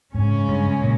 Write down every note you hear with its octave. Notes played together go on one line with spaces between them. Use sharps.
G#2 C#3 G#3 C#4
G2
A#2